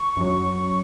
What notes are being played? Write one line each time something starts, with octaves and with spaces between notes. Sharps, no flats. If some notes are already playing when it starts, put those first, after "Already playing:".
Already playing: C#6
F#2 F#3